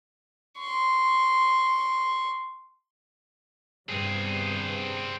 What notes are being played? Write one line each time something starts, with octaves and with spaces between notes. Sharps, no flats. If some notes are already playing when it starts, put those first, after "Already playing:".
C6 C#6
G2 C3 B3 C4 G#4